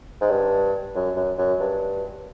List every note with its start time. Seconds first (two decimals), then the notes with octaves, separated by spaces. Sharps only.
0.21 G#2
0.30 G2
0.95 F#2
1.16 F#2
1.38 F#2
1.60 G2